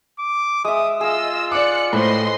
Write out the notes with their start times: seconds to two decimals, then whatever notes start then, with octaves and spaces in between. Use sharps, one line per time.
0.19 D6
0.65 G#3 E5 D#6
1.01 F4 G#4 D#5 F5 E6
1.52 D5 D6 F#6 C#7
1.93 A2 B4 C5 D#5 C6